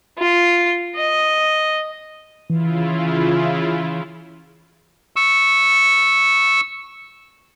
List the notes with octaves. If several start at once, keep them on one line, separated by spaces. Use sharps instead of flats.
F4
D#5
C#3 E3 E4 F4
C#6 E6